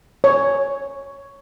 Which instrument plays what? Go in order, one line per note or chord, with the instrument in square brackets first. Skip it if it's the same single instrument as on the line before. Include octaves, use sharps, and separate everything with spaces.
[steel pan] C#5